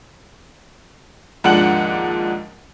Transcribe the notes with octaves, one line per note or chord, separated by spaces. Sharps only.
D#2 G#2 F3 D4 F#5 F#7